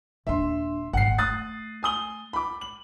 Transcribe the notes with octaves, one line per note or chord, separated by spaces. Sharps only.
D#1 D4 E5 C6
G#1 A#2 F#5 C7
A3 D#6 F#6 A6
G#5 D#6 G7
B5 D6
F#7